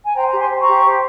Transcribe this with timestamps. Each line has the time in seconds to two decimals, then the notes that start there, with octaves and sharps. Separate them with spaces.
0.03 G#5
0.14 C5 G5 A#5
0.26 G4 A#5
0.37 G#5 C6
0.49 C5
0.60 A#5 C#6
0.66 G4
0.83 C5